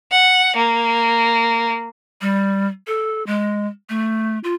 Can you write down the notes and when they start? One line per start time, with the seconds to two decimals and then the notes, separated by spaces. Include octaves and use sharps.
0.11 F#5
0.56 A#3
2.21 G3
2.87 A4
3.27 G#3
3.90 A3
4.44 F4